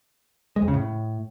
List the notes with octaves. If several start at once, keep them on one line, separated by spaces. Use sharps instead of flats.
G#3
F2
C#3
A2